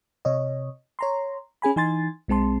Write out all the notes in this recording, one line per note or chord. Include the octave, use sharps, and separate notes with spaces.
C3 C#5 D#5
C#5 A#5 C6
C#4 G#4 G#5 B5
E3 D#4 G#5 C6 A6
B1 G#3 C4 A5 C6